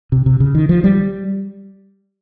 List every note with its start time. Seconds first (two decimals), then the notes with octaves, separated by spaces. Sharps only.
0.12 C3
0.26 C3
0.40 C#3
0.55 D#3
0.69 F3
0.84 G3